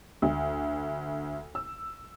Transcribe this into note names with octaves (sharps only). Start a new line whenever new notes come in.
D2
E6